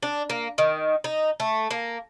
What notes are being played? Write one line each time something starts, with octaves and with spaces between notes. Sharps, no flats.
D4
A#3
D#3
D#4
A3
A#3